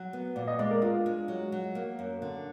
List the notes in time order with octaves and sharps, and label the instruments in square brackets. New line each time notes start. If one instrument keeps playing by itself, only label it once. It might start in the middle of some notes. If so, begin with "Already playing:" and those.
Already playing: [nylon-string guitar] F#3
B3
[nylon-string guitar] A#2 [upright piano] D5
[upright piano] D#5
[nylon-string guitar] G#3 [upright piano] D5
[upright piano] A#4
[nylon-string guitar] D4 [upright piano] F4
[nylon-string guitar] G#3
F#3
F#3
A#3
F#2
D3